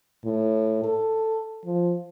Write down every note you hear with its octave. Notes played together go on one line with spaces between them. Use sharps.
A2
A4
F3